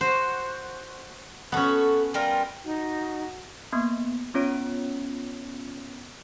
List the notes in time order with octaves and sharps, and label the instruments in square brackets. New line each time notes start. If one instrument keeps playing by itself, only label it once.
[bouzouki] F#4 [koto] C5
[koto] B3 C#4 [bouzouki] F#4 A4
[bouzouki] G3 F4 A#4
[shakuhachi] D#4 [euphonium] F#4
[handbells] A#3 B3
B3 C#4 F4 C#5 D7